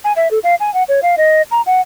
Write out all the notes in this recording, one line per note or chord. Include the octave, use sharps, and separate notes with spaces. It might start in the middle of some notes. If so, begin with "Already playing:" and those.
G#5
E5
A4
F5
G#5
F#5
C#5
F5
D#5
A#5
F#5